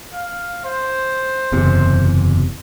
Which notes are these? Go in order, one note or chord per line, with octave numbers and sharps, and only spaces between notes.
F5
C5
F#1 E2 C3